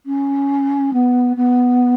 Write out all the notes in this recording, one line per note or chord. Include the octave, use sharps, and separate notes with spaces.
C#4
B3
B3